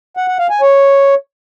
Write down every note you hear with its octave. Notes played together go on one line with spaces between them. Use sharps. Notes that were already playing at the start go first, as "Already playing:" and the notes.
F#5
F#5
F5
G#5
C#5